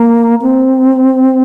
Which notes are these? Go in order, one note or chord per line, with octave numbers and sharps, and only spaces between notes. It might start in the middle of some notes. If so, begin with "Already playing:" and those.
Already playing: A#3
C4